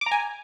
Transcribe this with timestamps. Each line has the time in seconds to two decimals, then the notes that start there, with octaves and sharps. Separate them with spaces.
0.01 D6
0.06 A#5
0.11 G#5